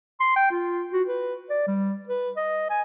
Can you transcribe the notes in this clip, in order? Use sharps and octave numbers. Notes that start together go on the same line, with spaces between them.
C6
G5
F4
F#4
B4
D5
G3
B4
D#5
G#5